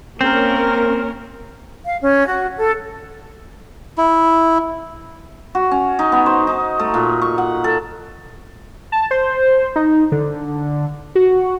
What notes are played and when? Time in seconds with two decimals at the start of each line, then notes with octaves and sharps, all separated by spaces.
0.21 A#3 C4 C#4 A#4
1.84 F5
2.01 C#4
2.26 F#4
2.57 A4
3.98 E4
5.55 F#4
5.71 C#4
5.99 D#4
6.12 B3
6.26 C5
6.47 D#4
6.79 A3
6.94 A#2
7.22 C#6
7.38 F#5
7.64 A4
8.92 A5
9.11 C5
9.76 D#4
10.12 D3
11.15 F#4